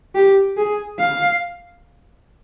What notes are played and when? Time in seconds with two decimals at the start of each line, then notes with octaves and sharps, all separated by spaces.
0.15 G4
0.57 G#4
1.00 F5